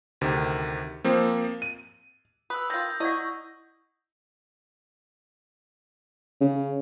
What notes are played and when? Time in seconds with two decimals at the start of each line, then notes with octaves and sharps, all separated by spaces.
0.21 D2 C3 D#3
1.04 F3 A#3 C4
1.62 D#7
2.50 B4 D#6 E6
2.70 D#3 F4 G6 A#6
3.00 E4 D5 D#5 F#5 C#6
6.41 C#3